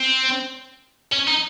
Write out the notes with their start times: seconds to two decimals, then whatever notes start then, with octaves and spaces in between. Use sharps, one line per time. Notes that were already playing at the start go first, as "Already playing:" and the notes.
Already playing: C4
1.12 C#4
1.28 D#4